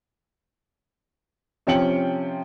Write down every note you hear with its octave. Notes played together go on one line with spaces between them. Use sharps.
C3 F3 C#4 G5 C#7 F#7